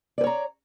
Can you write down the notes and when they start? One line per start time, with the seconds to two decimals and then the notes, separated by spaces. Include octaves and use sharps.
0.18 D5
0.21 B4
0.24 C#5
0.27 A#5